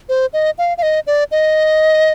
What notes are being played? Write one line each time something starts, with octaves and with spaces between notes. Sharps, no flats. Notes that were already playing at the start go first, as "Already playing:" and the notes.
C5
D#5
F5
F5
D#5
D5
D#5